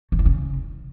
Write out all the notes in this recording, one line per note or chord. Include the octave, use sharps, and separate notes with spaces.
F#3
E3
C#3